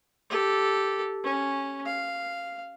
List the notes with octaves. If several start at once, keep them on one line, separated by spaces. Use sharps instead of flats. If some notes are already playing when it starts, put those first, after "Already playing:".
G4 A4
C#4
F5